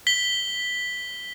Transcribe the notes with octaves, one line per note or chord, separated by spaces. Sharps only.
B6 G7